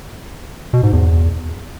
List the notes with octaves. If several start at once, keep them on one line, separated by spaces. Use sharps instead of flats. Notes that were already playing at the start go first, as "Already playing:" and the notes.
B2
G#2
E2